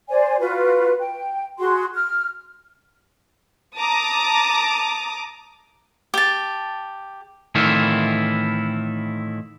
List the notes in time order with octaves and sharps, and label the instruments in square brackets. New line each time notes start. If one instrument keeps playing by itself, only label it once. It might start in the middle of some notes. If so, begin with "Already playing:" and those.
[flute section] C5 D5 G#5
F4 F#4 B4
G5
F#4 G#4 C6
F6
[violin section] A5 A#5 D6 D#6
[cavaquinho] G4 A5
[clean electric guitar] A2 D#3 E3 C4 E4 F4